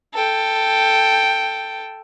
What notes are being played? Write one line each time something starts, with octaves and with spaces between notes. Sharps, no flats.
A4 G5